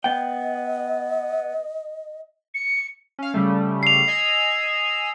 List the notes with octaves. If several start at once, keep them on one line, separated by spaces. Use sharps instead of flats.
B3 D#5 G5
C#7
C#4 F5
C#3 G3 A3
C7 F7
D#5 G#5 E6